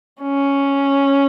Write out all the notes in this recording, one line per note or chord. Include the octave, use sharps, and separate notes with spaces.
C#4